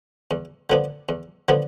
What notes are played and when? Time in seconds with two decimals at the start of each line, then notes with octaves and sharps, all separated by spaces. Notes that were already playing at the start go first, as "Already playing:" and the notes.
0.31 E2
0.70 D3 F3 B3 D4
1.09 E2
1.48 D3 F3 B3 D4